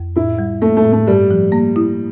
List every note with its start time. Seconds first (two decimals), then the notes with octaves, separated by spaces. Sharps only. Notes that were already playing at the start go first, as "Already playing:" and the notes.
Already playing: F2
0.16 A2 E4
0.39 G3
0.62 A3 A#3
0.77 A3
0.84 A2
0.92 A3
1.07 G2 G3
1.31 F3
1.52 A#3
1.76 E4